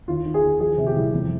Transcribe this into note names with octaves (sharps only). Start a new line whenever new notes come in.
D#2 F4
D#3
G#4
D#2
F3 G#4
C3
G4
C2
F2